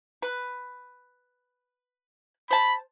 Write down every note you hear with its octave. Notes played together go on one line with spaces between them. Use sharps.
B4
C5 A5 B5